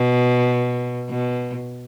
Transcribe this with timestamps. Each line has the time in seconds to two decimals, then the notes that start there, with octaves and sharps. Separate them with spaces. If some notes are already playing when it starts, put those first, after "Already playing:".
Already playing: B2
1.09 B2